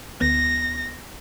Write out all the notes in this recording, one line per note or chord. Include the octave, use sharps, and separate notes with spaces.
D2 B3 A#6